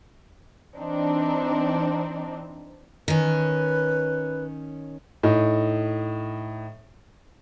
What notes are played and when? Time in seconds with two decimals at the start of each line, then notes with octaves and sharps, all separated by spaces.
0.77 E3 C4 D4 D#4
3.08 D#3 C#4 B4
5.23 A2 D#4